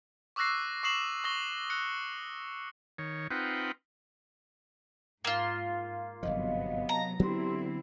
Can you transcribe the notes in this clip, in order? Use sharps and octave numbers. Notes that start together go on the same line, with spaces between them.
C#6 D6 E6 F#6 A#6 C7
C#6 D#6 C7 E7 F#7
C#6 D#6 A#6 G7
F#6 C#7
D#3 C#5
C4 D#4 F4 B4 F#5 G5
G#2 A#3 F4
G1 G#2 C3 F3 F#3 B3 D#5 F5
A#5
D3 F#3 B3 C4 D4 E4 G4 C6